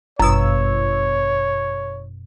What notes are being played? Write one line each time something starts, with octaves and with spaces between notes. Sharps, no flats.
G1 F#2 B2 C#5 E6